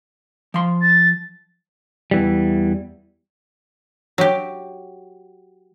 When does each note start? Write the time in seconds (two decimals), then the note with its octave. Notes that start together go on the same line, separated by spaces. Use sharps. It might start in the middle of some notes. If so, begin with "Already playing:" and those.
0.54 F3 C6
0.82 A6
2.11 E2 E3 G3
4.18 F#3 G4